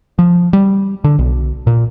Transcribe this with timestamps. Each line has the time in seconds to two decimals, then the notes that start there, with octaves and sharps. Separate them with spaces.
0.19 F3
0.53 G3
1.04 D3
1.19 B1
1.67 A#2